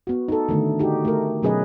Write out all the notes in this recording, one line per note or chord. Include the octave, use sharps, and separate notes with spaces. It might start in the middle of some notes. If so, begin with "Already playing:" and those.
B3 F#4
D#4 A4
D3 D#3 A3
D#4 F#4 G4
A3 A#4
B2 F#3 C#4 G#4 B4 D#5